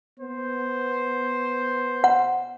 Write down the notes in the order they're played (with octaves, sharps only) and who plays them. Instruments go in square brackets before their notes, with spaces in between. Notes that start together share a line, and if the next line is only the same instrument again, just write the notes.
[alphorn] B3 [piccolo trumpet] C5
[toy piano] F#5